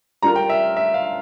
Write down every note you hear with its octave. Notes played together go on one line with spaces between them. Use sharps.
G3 D4 F4 A#4 A#5
G5
E5
E5
F5